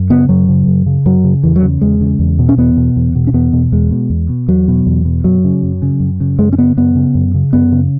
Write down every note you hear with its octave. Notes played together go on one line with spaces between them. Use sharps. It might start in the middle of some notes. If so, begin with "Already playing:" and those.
Already playing: F#2
C#3 B3
F#2 F#3
C#3
F#2
C#3
F#2 F#3
C#3
E2 E3
F#3
C#3
E2 G#3
C#3
E2
B2
C#4
E2 B3
B2
E2
B2
C#4
E2 B3
B2
E2 G#3
B2
E2
B2
E2 F#3
B2
E2
B2
F#2 F#3
C#3
F#2
C#3
F#2
C#3
F#2 G#3
C#4
C#3 B3
F#2 B3
C#3
F#2
C#3
F#2 B3
C#3